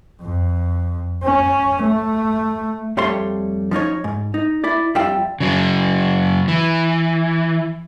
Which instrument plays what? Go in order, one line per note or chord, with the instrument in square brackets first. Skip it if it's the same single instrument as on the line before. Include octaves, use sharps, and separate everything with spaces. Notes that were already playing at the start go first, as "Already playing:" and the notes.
[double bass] F2
C#4
A3
[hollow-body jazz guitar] F2 G3 A3 C#5 C6
F3 C#4 D#4 C#5
G#2
D#4
E4 D5
F2 G3 F4 E5 G5
[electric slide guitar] C#3 F#3
E3